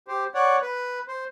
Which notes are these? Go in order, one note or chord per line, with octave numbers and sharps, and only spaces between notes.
G4 C5
C#5 D5 F#5
B4
C5